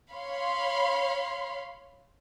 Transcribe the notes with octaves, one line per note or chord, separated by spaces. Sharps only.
C#5 F5 B5 C6